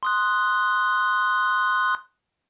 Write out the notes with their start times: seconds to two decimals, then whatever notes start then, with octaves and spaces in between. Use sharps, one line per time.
0.03 C6 D#6 F#6